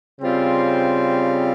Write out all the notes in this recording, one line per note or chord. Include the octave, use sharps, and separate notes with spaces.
C#3 G3 C4 F4